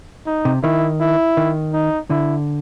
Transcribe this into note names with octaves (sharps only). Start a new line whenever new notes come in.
D#4
C3
D#3 E4
E4
D#3
D#4
D3 E4